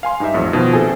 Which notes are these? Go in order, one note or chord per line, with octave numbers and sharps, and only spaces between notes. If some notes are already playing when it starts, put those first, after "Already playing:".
F5 G#5 C6
G2 D#4 G4 E5
A1 F2
B2 D#3 F3
A#1 C4 G#4 A4 G#5